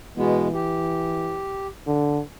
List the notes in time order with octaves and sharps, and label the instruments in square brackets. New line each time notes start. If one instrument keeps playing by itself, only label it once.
[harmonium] B2 G#3 B3 [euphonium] E3
[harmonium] G4
[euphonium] D3